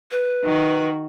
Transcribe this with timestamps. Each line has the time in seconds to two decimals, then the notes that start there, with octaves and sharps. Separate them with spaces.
0.11 B4
0.44 D#3 F#4